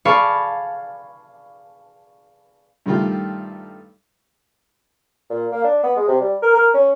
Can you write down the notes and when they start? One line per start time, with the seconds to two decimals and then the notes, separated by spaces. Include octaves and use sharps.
0.05 D5 F5 G#5 A5 B5 C#6
2.86 G2 D#3 G3 A3 F4 G5
5.30 A#2
5.52 A#3
5.64 D4
5.84 B3
5.96 G#3
6.08 C3
6.21 G3
6.42 A#4
6.54 A#4
6.74 C#4